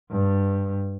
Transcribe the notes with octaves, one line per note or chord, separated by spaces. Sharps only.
G2